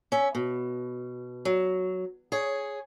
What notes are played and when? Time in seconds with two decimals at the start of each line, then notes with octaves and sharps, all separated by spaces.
0.12 C#4 E5
0.35 B2
1.45 F#3
2.32 G#4 C#5